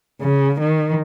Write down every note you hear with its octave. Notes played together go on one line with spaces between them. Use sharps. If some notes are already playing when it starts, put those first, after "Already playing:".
C#3
D#3